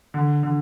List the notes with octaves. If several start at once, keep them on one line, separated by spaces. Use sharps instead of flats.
D3
D3